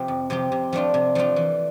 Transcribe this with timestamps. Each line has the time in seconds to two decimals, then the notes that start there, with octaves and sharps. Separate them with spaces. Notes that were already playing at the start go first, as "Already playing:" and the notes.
Already playing: C3 F3 C4 G4
0.08 F2
0.30 C3 F3 C4 G4
0.52 C3
0.73 F3 A3 D4 F4
0.94 C3
1.15 F3 A3 D4 F4
1.36 E3